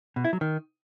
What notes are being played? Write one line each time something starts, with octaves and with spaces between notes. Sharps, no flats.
B2
E4
F#3
D#3